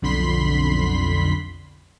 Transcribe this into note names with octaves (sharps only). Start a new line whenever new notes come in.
B1 F2 D3 B5 C6 B6